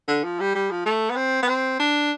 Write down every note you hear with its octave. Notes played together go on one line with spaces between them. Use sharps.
D3
F3
G3
G3
F3
A3
B3
C4
B3
C4
D4